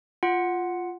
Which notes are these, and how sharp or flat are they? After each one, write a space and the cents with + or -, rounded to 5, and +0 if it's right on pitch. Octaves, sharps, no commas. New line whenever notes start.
F4 +0 F#5 +0